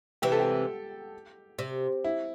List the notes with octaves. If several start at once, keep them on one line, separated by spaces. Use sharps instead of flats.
C3 E3 G4
A4
G4
C3
E4